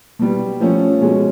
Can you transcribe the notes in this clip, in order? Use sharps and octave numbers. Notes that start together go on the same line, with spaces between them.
B2 G3 B3
F3 A3 C#4
B2 G#3 C#4 F#4